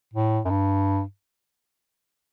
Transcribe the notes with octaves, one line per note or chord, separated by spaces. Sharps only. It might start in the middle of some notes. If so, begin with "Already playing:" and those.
A2
F#2
G2